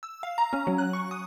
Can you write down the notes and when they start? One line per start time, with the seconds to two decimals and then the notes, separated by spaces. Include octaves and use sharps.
0.03 E6
0.23 F5
0.38 A#5
0.53 C#4
0.67 F#3
0.78 F#6
0.93 C#6
1.11 D#6